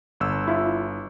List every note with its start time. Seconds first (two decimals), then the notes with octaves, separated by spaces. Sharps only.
0.20 G1 E6
0.48 E4 F4